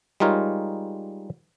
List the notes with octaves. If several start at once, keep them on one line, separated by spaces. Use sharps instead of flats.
G3 G#3 D#4 F4 A#4 C#5